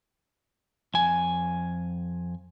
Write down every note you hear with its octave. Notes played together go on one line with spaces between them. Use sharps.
F2 G#5